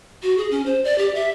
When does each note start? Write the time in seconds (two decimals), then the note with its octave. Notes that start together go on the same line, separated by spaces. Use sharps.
0.23 F#4
0.38 G#4
0.51 C#4
0.66 C5
0.84 D5
0.98 G4
1.15 E5